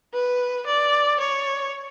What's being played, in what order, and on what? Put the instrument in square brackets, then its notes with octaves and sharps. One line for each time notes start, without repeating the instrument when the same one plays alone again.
[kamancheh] B4
D5
C#5